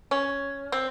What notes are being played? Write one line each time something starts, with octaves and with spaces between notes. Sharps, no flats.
C#4
C4